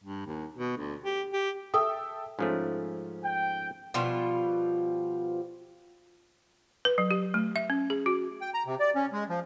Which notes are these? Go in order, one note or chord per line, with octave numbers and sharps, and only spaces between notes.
G2
D#2
B2
D2
G4
G4
A4 E5 G5 D#6
G#2 F3 A3 C#4
G5
B2 F3 G3 F4
B4
F#3
G4
A3
E5
C#4
G#4
F#4
G5
A#5
C3
D5
C#4
G#3
F3